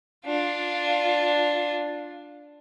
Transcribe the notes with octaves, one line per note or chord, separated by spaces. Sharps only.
D4 F4